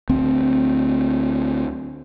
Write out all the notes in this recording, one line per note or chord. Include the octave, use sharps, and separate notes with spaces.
D2 C4